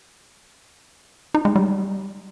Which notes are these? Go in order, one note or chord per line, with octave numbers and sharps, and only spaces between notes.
D#4
G#3
G3